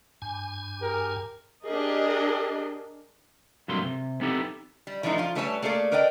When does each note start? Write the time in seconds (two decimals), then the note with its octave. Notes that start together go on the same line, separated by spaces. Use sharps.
0.22 G2 G#5
0.81 G4 G#4 A#4
1.66 D4 G4 G#4 A#4 D#5
3.68 G2 C3 F#3 A3 A#3 C6
3.85 C3
4.21 B3 C4 D#4 E4 G4 A4
4.87 G3
5.03 E3 F3 G#3 A3 D#4
5.18 F3 F4
5.35 G3 A3 B4 C#5 G#5 A5
5.62 A3 A#3 G#4 A4 D5
5.92 A#4 B4 D5 D#5 G5